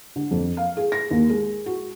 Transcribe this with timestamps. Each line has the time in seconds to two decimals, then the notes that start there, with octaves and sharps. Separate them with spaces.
0.16 D3
0.31 F2
0.57 F5
0.77 G#4
0.92 A#6
1.11 D#2
1.29 G#3
1.66 F#4